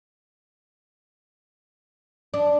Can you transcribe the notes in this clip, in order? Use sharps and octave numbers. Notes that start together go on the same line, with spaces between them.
D4